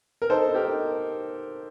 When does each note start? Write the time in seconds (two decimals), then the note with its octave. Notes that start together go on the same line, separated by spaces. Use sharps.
0.22 A#4
0.30 D#4 A4 C5
0.49 D#4
0.55 G4 A#4
0.68 D#4